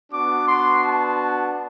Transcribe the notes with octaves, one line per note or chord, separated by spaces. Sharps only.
B3 D4 F#4 D6
C6
A5